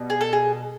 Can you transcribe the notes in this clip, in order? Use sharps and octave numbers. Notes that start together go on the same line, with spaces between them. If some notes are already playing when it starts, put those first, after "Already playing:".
Already playing: B2 G3
G#4
A4
G#4